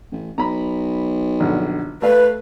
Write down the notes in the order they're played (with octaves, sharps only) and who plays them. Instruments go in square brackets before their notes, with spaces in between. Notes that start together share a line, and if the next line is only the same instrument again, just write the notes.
[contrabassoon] A1
[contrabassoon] B1 [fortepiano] A#5 B5
[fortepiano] A#1 D3 F#5
[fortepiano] A3 F5 [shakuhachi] B4